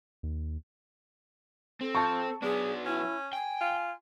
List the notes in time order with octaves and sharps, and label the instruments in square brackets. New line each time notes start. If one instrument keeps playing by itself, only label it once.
[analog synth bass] D#2
[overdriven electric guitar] C4 [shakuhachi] A4
[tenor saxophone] F3 [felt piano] A5 C#6
[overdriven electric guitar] F#3 B3 [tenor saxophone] D4 [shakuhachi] G#4
[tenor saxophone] C#4 [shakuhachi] E4
[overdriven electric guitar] G5 [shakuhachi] G#5
[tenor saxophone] F4